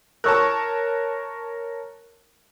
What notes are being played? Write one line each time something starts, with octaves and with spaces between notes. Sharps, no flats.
A#4 C#5 A5 C#6 E6 F#6